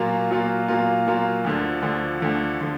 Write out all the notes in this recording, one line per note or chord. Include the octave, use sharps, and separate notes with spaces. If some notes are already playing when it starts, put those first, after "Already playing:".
Already playing: A#2 F#3 A#3 F4
A#2 F#3 A#3 F4
A#2 F#3 A#3 F4
A#2 F#3 A#3 F4
D2 D3 F3
D2 D3 F3
D2 D3 F3
D3 F3